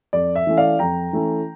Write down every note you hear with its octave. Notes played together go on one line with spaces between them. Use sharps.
F2 D5
E5
E3 A3 C#4
D5 F5
F2 G5 A#5
E3 A3 C#4